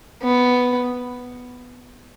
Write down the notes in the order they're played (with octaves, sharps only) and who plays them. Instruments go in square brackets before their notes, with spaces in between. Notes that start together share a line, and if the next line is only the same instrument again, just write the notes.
[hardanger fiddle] B3